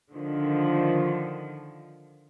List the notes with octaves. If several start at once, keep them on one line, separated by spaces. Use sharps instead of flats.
D3 D#3 F3